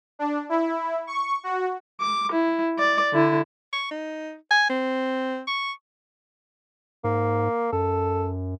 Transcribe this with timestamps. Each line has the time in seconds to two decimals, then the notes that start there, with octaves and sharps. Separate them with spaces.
0.19 D4
0.49 E4
1.07 C#6
1.44 F#4
2.01 D6
2.32 E4
2.79 D5
3.13 D3 E4
3.73 C#6
3.91 D#4
4.51 G#5
4.70 C4
5.47 C#6
7.04 G#2 A#3
7.72 F#2 A4